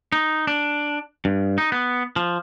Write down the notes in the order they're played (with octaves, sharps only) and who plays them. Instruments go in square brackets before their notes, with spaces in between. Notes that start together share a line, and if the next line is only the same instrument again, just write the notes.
[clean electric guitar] D#4
D4
G2
D#4
B3
F3